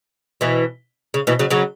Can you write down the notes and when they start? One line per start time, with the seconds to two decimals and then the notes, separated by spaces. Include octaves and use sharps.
0.41 B2 E3
1.14 C#3
1.27 B2 E3
1.39 C#3 F#3
1.50 C#3 F#3